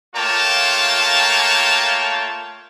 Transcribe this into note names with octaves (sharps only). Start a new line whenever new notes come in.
A3 A#3 F4 C#5 G5 A5